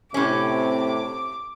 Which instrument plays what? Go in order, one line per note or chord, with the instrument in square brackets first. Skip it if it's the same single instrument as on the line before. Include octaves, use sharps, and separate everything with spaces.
[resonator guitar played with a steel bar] A2 C#4 [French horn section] C3 [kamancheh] D6